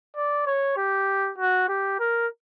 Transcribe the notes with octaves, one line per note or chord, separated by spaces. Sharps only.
D5
C#5
G4
F#4
G4
A#4